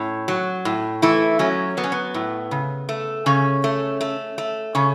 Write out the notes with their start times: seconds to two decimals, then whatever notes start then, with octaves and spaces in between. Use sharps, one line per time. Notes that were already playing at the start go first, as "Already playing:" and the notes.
Already playing: A2 C#4
0.28 F#3
0.65 A2
1.02 E3 A3 E4
1.39 F#3 C#4
1.77 F#3 B3
1.84 C#4
1.92 B3
2.14 A2
2.51 C#3
2.89 A3
3.26 C#3 C#4
3.64 A3
4.01 A3
4.38 A3
4.75 C#3 C#4